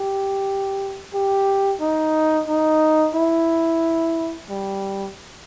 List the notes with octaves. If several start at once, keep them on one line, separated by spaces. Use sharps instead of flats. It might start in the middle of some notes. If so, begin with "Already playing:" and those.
Already playing: G4
G4
D#4
D#4
E4
G3